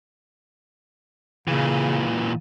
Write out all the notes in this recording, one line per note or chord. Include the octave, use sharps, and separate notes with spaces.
A#2 C#3 E3